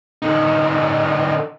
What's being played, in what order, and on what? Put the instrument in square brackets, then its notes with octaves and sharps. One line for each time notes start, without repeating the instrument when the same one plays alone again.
[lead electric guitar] D3 D#4